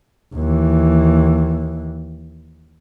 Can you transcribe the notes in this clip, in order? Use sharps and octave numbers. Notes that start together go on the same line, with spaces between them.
D#2 E3